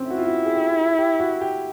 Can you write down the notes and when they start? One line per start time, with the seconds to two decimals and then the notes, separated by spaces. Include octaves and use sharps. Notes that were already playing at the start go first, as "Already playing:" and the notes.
Already playing: C4 C#4
0.10 E4 F#4
0.18 F4
0.26 F#4
0.46 G#4
0.54 G4
0.98 G4
1.20 F#4
1.41 G4